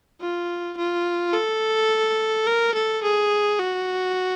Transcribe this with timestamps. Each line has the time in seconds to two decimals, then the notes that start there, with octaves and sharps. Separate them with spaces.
0.21 F4
0.77 F4
1.33 A4
2.47 A#4
2.74 A4
3.03 G#4
3.59 F#4